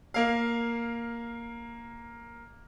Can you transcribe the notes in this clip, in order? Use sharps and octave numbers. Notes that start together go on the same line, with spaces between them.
A#3 F5